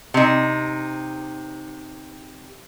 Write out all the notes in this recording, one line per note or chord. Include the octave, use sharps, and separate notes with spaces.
C3 D#4